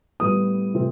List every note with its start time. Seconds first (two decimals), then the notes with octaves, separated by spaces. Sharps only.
0.20 A2 G3 B3 D#6
0.74 C3 E3 A3 C4